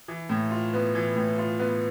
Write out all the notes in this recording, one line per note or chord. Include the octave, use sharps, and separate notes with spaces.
E3
A2
F4
B3
E3
A2
F4
B3